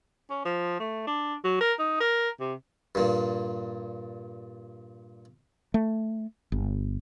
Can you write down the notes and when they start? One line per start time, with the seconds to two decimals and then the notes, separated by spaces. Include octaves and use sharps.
0.30 C#4
0.45 F3
0.80 A3
1.07 D4
1.44 F#3
1.61 A#4
1.79 D#4
2.00 A#4
2.40 C3
2.95 G2 A#2
5.74 A3
6.52 G1